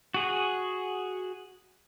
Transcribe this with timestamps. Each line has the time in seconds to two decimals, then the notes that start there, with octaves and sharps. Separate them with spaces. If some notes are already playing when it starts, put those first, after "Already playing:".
0.14 F#4 G#4